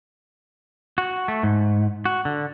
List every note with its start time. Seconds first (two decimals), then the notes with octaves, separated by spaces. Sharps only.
0.98 F#4
1.28 A3
1.43 G#2
2.05 F#4
2.25 D3